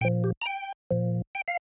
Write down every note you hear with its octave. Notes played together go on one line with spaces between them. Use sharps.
A#2 F3 G5
G4
A#5
G5
A#2 F3
G5
F5